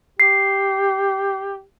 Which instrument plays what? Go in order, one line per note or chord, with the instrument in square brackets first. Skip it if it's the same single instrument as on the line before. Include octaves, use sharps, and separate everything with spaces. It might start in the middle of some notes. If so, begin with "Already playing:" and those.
[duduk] G4 [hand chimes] C7